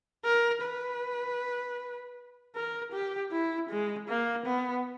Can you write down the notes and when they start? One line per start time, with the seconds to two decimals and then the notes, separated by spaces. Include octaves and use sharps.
0.25 A#4
0.62 B4
2.55 A#4
2.92 G4
3.32 E4
3.70 G#3
4.08 A#3
4.46 B3